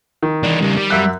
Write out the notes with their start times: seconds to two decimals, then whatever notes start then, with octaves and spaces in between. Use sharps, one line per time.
0.23 D#3
0.43 E3 D4
0.61 C#3 G3
0.77 G3
0.90 F#2 E5 F#6